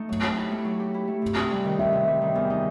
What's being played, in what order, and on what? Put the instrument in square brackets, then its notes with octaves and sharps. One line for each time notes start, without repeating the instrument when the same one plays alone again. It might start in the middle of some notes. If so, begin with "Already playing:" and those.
Already playing: [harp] A3 D#4
F#3
G4
E4
A3
F#3
G4
E4
A3
C3
C3
G3
D#3
[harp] C3 [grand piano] E5
[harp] C3
G3
D#3
E2
D#4